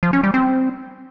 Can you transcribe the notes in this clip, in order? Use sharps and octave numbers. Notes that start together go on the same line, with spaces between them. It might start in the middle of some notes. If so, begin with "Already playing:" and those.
F3
C#4
G3
C4